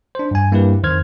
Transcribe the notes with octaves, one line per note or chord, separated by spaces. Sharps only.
D4 C5
G2 G#5
G2 A#3 E4 G4 B4
F2 D#3 C5 F6 G#6